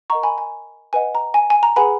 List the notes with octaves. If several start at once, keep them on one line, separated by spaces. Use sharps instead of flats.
A#4 D#5 F#5 A#5 C#6
G#5 B5
G#5
B4 D#5 F#5 G#5
A#5
G#5
G#5
A#5
G#4 B4 F#5 G#5 B5